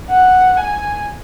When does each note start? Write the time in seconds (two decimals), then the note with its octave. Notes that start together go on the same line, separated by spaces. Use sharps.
0.10 F#5
0.57 G#5